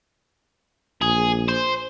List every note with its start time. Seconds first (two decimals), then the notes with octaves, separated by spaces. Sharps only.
1.01 A#1 G#4
1.49 C5